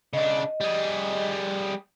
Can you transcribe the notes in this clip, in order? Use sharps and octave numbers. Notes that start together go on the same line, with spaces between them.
C#3 D4 D#5
G3 G#4